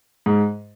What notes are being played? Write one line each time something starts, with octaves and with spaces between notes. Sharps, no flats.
G#2